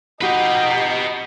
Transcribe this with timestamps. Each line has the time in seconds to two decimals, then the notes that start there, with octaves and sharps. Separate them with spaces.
0.21 F2 D#4 F#4 G4 B4 D#5